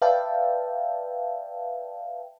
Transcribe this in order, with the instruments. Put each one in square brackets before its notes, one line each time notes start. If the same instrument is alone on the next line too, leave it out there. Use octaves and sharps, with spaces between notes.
[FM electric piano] B4 D5 E5 F5 G5 A5